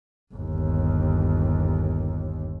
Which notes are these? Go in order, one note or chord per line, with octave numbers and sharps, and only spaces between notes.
G1 D#2